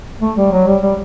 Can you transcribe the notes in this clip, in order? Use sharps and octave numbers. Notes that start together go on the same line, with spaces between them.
A3
G3
F#3
G3
G3